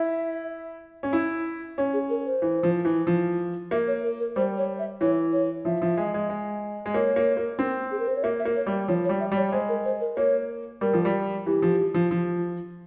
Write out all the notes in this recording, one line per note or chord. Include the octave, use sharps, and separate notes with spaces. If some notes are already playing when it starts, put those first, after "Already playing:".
Already playing: E4 E5
C#4
E4
C#4 C#5
G#4
A#4
C5
E3
F3
E3
F3
A#3 E5
C#5
A#4
A#4
G3 C5
C#5
E5
E3 C#5
C#5
F3 E5
F3
G#3
G#3
G#3
G#3
A#3 C#5
A#3
A#3
C4
G#4
A#4
C5
C#5
A#3 E5
E5
A#3
C#5
G3
F3 C#5
C#5
G3
E5
G3
C#5
G#3 C5
A#4
C5
A#4
A#3 C#5
G3 A#4
F3
G3
E3 G4
F3
F3
F3